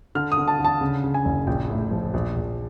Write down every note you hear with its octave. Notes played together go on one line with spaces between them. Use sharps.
D3 F6
D#6
D3
A5
D3
A5
C#3
C#3
G#5
F#1
A#1 G5
A2
F3
A#1
A#1